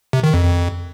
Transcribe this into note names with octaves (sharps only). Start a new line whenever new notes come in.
C3
D#3
F2
F2